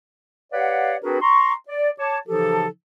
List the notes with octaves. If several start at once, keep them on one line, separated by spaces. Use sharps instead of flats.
G4 B4 C#5 D5 F5 F#5
C4 D4 F#4 G#4 A#4 B4
A#5 C6 C#6
D5
C#5 A5 D6
C#3 E3 F3 D#4 G4 A4